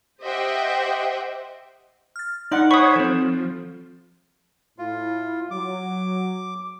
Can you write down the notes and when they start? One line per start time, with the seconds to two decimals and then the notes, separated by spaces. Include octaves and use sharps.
0.23 G4 C5 D#5 E5 F#5 G5
2.16 F6 A6
2.52 D#4 D5 F#5 C6 F#7
2.71 C5 C#5 F#5 G#5 B5 C#6 D#6
2.96 F3 C4 A4
4.78 A2 E4 F4
5.51 F#3 D6